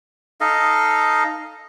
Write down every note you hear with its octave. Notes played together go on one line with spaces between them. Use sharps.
D#4 A4 D#5 F5